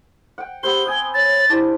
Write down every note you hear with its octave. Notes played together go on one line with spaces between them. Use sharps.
F#5 G5
B3 C4 G4 C5 G7
G5 G#5 D#6
C#5 A6
D4 E4 G4 C5